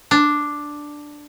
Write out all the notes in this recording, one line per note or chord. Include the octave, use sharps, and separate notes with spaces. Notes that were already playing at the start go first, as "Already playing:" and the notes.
D4